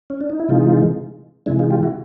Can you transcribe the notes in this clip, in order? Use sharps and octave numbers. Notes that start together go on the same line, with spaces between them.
C#4
D4
D#4
E4
C3 E3 G#3 D#4 F4
C3 E3 G#3 D4 E4
D#4 F4
F4 G4
E4 F#4